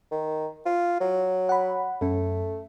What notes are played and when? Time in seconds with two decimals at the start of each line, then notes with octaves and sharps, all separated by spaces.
0.12 D#3
0.66 F4
1.00 F#3
1.49 F#5 B5
2.01 F#2 A3 C#4